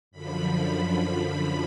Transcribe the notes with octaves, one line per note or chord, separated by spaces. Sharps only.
F#2 D3 F3 B5
B5